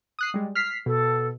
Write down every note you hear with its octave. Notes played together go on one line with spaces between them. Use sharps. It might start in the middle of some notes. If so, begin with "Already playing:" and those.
D#6 F#6 C7
G3 G#3
F6 B6 C7
B2 A4